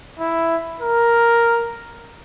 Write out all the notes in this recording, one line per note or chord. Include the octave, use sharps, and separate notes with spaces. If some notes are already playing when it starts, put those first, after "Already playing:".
E4
A#4